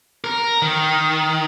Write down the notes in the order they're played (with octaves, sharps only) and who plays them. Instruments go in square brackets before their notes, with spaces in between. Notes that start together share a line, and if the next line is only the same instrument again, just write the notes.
[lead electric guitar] A#4
D#3